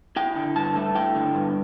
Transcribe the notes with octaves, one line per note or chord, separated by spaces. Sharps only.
E4 G5
D3
G2 A5
A3
E4 G5
D3
G2